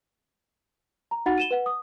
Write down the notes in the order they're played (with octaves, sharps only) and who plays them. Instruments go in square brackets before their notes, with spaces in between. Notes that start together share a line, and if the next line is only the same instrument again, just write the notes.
[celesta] A#5
D#4 F#4 F#5 B5 A6
D#7 E7 G7
B4 F#5
D#6